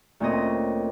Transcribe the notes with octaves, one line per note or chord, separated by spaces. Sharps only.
D2 A#2 C4 C#4 C5 D#5